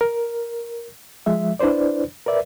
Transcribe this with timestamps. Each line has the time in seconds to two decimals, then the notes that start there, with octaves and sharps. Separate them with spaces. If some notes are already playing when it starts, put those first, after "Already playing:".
0.01 A#4
1.26 F3 G#3 E5
1.59 D4 E4 B4 C5 D5
2.26 A#4 B4 D5 E5